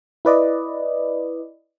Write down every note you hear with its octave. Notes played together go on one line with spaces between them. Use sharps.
E4 B4 D5 D#5